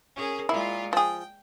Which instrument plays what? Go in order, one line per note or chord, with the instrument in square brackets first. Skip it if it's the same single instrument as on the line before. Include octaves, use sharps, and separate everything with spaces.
[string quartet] C#4 G#4 A#4
[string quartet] A#2 G#3 F4 [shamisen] E4
[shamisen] F3 G#4 [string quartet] G5